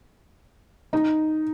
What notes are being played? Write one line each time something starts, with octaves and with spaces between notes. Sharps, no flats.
D#4